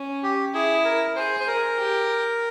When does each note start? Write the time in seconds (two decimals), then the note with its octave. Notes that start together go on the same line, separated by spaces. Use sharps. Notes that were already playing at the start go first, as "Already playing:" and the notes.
Already playing: C#4
0.23 G4
0.54 E4 G#4
0.85 A#4
1.15 G#4 C5
1.40 C5
1.47 A#4
1.78 G4